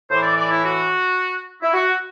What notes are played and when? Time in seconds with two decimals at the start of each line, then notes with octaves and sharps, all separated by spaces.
0.10 A2 E3 C5
0.23 D5
0.37 D5
0.51 E4
0.65 F#4
1.63 E4
1.74 F#4